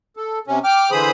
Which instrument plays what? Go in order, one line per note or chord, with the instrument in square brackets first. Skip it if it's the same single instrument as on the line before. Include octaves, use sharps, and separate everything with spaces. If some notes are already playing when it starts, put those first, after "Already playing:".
[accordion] A4
C3 C#4
G5 D6 F6
D3 E3 G#4 C5 B5 D#6